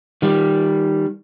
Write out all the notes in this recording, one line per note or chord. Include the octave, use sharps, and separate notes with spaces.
D#3 G3